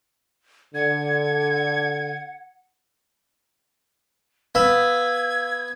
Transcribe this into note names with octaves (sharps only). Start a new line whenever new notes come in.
D3 F#5 G#6
B3 F5 E6 G#6